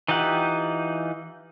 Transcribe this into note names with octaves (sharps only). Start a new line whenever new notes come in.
E3 D#4 F4 G4 F#5